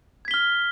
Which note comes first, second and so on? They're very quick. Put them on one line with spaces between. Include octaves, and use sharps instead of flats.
G#6 B6 G7 F6